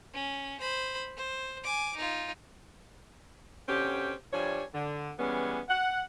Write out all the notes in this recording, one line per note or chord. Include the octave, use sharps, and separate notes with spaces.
C#4
C5 B5
C5
G#5 D6
D#4 F4
B2 D3 C4 C#4 G4
G2 F3 G3 D4 C#5 G#5
D3
E3 G3 G#3 B3 C#4
F#5